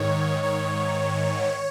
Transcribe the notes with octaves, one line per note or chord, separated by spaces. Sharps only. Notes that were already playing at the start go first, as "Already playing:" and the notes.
Already playing: G#2 D#3 C#5
G#2 D#3 C#5